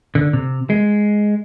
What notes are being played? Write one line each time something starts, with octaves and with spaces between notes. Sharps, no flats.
D3
C3
G#3